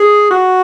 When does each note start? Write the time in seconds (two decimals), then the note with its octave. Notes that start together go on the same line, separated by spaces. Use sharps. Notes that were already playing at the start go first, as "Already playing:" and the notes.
Already playing: G#4
0.31 F#4